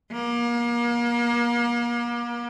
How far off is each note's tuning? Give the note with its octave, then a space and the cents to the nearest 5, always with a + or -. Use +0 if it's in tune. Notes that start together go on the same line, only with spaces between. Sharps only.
A#3 +35